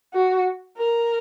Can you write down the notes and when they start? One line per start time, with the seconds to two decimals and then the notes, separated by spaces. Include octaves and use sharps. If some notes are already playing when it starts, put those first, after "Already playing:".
0.14 F#4
0.78 A#4